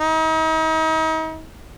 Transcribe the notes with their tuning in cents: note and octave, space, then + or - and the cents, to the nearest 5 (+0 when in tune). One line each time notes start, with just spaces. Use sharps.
D#4 +40